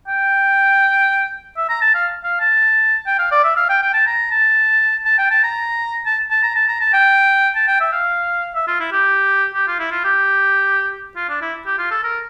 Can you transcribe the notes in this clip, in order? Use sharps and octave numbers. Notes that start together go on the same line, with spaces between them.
G5
E5
A#5
A5
F5
F5
A5
G5
F5
D5
E5
F5
G5
G5
A5
A#5
A5
A5
G5
A5
A#5
A5
A5
A#5
A5
A#5
A5
G5
A5
G5
E5
F5
E5
F4
E4
G4
G4
F4
E4
F4
G4
F4
D4
E4
G4
F4
A4
A#4